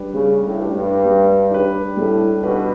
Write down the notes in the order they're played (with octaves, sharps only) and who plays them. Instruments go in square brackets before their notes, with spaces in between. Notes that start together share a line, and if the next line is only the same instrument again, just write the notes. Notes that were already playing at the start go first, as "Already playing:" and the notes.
Already playing: [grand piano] G3 D4 G4 B4
[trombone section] C#3 [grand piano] G3
[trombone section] A2
[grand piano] D4 G4 B4
[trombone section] G2
[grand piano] G3
D4 G4 B4
[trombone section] A2 [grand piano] G3
[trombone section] B2 [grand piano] D4 G4 B4